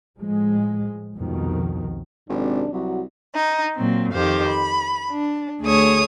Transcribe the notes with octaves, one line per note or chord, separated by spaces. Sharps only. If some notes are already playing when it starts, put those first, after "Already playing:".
A2 F3 G#3
C2 F2 B2 D#3 F3
G#1 F#2 C3 D4
C2 F#3 F#4
D#4
A#2 F#3 C4
F2 D#3 G4 C5 F5
B5
D4
D2 A3 G#4 C#5 D#6